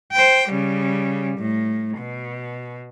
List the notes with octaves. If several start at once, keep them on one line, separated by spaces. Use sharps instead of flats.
C5 G5
C#3 G3
A2
B2